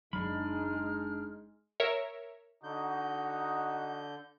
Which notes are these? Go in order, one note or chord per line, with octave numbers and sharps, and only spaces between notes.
F#1 F#3 G#3 D4 D#4 B5 F6
A#4 C#5 E5
D3 D#4 F#4 G6